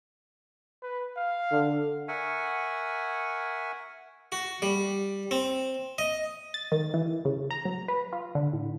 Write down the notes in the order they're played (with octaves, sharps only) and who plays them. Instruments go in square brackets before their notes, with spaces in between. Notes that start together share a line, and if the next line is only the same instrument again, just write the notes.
[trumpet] B4
F5
[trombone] D3
[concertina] A#4 E5 F#5 G#5 C#6
[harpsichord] F#4
G3
C4
D#5
[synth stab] A6
D#3
E3
C#3
A#5
F#3
B4
F4
D3
A2